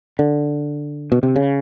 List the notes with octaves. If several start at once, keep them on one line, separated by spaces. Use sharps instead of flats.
D3
B2
C3
C#3